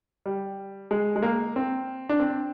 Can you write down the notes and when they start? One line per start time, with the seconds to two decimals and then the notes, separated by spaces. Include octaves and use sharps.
0.26 G3
0.91 G#3
1.16 G#3
1.22 A#3
1.56 C4
2.09 D4
2.20 C4